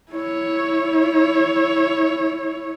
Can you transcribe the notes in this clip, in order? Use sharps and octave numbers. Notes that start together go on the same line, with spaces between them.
E4 C#5